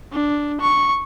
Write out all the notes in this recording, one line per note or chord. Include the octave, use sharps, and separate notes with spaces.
D4
C#6